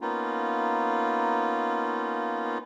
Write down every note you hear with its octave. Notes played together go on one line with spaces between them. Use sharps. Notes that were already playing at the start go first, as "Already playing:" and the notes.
A#3 B3 C#4 D#4 F4